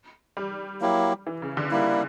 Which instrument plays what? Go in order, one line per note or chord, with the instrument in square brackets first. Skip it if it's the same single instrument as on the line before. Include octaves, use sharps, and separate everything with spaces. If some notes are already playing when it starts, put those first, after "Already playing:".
[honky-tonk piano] G3
[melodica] F#3 A#3 E4 G4
[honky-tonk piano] E3
C#3
D3
[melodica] G3 A#3 E4